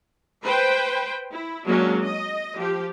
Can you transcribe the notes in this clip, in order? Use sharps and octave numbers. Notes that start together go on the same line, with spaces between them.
B4 C5 G5
E4
F#3 G#3 A#3 C#4 D4
D#5
F3 G4